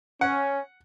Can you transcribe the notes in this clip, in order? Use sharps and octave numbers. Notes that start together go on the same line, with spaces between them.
C#4 F#5